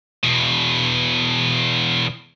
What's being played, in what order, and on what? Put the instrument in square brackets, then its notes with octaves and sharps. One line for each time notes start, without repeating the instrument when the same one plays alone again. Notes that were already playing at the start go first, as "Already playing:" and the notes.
[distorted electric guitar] E2 B2